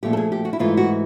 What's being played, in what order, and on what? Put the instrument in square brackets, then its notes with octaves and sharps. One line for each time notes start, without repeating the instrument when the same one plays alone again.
[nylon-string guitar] A#2 F3 A3 G4
A4
G#4
G4
F#4
E4
G#2 E3 A3 F4
F#4